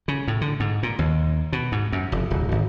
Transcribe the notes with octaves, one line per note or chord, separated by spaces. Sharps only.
C#3
A2
D3
G#2
A#2
D#2
B2
G#2
F#2
F1
D1
G#1